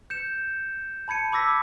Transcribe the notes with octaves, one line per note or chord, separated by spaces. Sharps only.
G6 C#7 E7
A5 B5 G#6 C#7 D#7
B5 D6 E6 A#6 B6